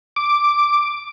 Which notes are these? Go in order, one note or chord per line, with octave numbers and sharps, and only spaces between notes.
D6